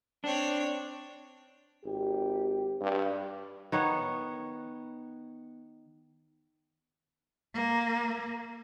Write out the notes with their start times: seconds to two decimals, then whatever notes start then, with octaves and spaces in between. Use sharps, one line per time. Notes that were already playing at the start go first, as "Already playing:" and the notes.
0.24 C4 D4 C#5
1.85 G#1 G4
2.81 G2
3.72 D#3 B3 C#5 F#5
7.55 A#3